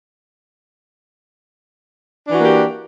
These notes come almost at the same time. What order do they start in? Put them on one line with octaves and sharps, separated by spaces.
D4 E3 F#4 A#3 G4